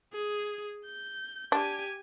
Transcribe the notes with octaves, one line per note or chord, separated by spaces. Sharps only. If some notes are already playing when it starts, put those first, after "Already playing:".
G#4
G6
D4 G4 G#5